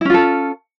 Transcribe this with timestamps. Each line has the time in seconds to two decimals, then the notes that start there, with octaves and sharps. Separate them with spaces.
0.01 E4
0.05 C#4
0.10 F4
0.14 A4